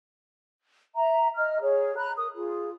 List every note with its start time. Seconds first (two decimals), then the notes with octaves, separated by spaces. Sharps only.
0.96 E5 A#5
1.36 D#5 F6
1.61 G#4 C#5
1.97 A#5 B5 F#6
2.17 A#4 D#6
2.34 F4 G#4